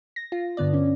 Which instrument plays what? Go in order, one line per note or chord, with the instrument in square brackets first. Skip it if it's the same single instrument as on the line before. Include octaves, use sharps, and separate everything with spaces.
[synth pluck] A#6
F4
G2 D3 B3 D5
C#4